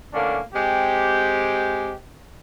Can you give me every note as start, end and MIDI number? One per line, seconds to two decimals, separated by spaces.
0.14 0.39 45
0.14 0.39 50
0.14 0.39 58
0.14 0.39 61
0.14 0.39 62
0.54 1.93 56
0.54 1.93 60
0.54 1.93 67